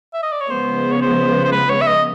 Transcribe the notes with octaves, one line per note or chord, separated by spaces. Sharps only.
E5
D#5
D5
C#5
C#3 F3 G#3 B3 C5
C#5
C5
C5
B4
C#5
E5
D#5